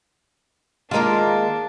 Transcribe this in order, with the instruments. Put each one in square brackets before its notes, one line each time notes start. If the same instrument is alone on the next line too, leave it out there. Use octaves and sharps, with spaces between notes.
[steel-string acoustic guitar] D#3 G#3 A#3 [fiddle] D4 [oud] F4 A#4